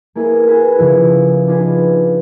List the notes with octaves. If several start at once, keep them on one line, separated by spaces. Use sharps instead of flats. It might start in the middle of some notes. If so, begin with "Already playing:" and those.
A#3 B3 E4 G#4
F#4 G#4 B4
C#3 F3 E4
D4 D#4 F4 G#4 B4